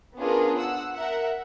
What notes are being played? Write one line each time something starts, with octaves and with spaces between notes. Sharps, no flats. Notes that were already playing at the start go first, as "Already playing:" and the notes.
B3 C#4 D4 F4 G#4 A#4
F#5 E6
A#4 E5 F#5